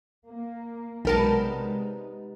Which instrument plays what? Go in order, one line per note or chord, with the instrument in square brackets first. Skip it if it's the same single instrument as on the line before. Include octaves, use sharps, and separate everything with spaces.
[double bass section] A#3
[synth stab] B1 A#4 A5 [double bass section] C3 G#3 [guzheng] G3 B3 D#4